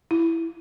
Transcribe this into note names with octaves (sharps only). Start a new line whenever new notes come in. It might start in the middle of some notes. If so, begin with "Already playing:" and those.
E4